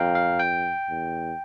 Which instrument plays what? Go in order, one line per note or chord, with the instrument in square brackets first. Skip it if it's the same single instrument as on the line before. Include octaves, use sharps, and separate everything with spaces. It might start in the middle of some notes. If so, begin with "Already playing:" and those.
Already playing: [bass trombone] F2 [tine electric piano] F5 G5 A#5
[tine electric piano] F5
G5
[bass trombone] E2